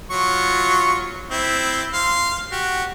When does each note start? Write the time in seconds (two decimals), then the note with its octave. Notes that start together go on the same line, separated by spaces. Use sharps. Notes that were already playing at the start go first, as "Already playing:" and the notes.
0.11 F#3 F4 C#6
1.31 C4 E4
1.93 F5 C6
2.52 F#4 G4